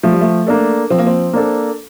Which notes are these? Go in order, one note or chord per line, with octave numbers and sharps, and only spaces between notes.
F3 A3
G3
A3
A#3 D4 A4
F3 C4
A#3
C4
A#3 D4 A4